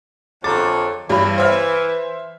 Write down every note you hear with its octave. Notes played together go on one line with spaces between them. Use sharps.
F2 D3 G#4 C#5 A#5 D6 A6
G2 E3 G3 B4 B5
C5 E5 F6